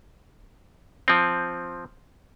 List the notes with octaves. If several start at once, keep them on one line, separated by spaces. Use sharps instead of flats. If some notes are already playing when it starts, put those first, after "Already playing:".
F3 C4